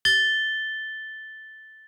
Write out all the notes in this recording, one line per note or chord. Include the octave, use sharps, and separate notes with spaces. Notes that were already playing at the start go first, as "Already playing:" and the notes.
A6 G7